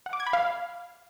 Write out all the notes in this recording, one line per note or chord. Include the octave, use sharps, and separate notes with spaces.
F#5
D6
G#6
B5
F5